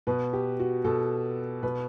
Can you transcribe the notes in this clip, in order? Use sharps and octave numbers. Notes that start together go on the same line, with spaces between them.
B2 B4
G4
F#4
B2 A4
B2 B4